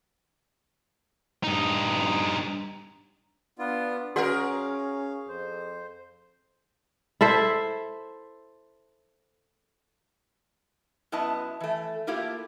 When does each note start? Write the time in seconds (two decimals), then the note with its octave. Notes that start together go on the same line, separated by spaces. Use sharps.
1.43 G2 D#4
3.59 B3 D4 F4
4.16 C#4 F#4 G#4 A#4 D5 F5 F#5
5.28 F2 C5
7.21 E4 A4 C5 E5
11.12 F#2 B3 E4 D#5 A5
11.60 E3 A3
12.07 A3 A#3 E4 F4 G4 A#4